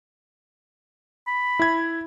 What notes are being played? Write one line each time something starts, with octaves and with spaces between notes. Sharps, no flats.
B5
E4 G#6